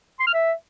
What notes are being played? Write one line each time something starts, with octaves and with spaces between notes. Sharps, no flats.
C6
F6
E5